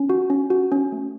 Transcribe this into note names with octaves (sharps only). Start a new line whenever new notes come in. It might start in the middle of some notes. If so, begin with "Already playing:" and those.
Already playing: C#4
F#4
C#4
F#4
C#4
A3